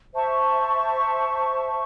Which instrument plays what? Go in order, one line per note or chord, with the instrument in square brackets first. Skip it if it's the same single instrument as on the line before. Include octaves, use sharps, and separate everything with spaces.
[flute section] C5 E5 A5 C#6